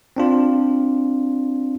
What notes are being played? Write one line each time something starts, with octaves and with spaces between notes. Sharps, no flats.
C4 D4 F4